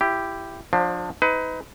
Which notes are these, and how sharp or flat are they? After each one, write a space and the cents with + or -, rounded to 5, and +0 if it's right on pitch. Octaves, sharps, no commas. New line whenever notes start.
E4 +20 G4 +0
F3 +35 D4 +25 C5 +0
D#4 +35 B4 +30